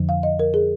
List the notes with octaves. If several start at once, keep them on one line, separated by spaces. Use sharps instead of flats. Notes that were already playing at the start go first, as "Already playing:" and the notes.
Already playing: F2 D3 F3
F5
D#5
A#4
G#4